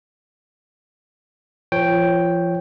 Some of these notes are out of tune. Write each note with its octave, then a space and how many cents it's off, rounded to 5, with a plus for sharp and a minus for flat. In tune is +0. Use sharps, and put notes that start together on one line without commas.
F3 -30 C#5 +0 G5 +0